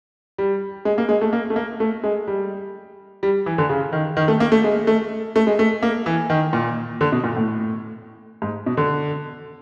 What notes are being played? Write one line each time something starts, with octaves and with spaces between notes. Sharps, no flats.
G3
G#3
A#3
G#3
A3
A#3
A3
A#3
A3
G#3
G3
G3
E3
D3
C#3
D#3
D#3
A3
A#3
A3
G#3
A3
A3
G#3
A3
A#3
E3
D#3
A#2
D3
B2
A#2
A2
G#2
B2
D3